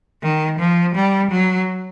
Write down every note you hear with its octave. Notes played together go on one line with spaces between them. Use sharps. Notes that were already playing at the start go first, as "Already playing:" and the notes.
D#3
F3
G3
F#3